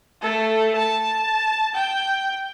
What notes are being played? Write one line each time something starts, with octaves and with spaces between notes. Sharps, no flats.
A3 A4
A5
G5